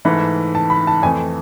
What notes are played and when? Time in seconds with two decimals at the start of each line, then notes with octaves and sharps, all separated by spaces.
0.05 G#2 E3 A3 B5
0.55 A5
0.70 B5
0.87 A5
1.02 F2 E3 A3 G#5